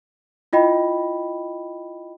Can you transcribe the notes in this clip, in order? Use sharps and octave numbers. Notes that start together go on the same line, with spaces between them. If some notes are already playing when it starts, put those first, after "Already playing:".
E4 F4 D#5 G5 B5